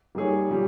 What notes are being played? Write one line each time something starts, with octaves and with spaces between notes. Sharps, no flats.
G3 A#3 D#4 G#4 C#5
A#2 G3 C#4